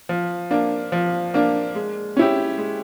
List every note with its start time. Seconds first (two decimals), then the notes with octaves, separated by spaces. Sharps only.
0.09 F3
0.51 A#3 D4
0.92 F3
1.34 A#3 D4
1.75 G#3
2.17 C#4 E4 G4
2.58 G#3